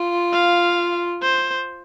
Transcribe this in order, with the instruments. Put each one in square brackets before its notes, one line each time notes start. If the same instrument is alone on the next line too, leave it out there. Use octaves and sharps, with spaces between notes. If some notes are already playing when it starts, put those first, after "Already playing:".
Already playing: [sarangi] F4
[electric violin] F5
C5